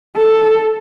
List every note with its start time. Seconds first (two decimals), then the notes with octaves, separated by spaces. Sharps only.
0.16 A4